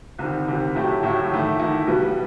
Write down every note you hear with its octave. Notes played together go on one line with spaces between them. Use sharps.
C2 C3 D#3
C2 C3 D#3
A2 F#3 A3 E4 G4
A2 F#3 A3 E4 G4
E2 D#3 A3 E4
E2 D#3 A3 E4
B1 B2 G3 B3